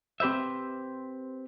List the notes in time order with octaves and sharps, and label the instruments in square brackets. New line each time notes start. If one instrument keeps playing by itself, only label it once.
[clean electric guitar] C4 G4 B4 C5 E5